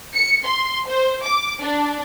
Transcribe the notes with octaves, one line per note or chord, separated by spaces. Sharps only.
C#7
C6
C5
D6
D4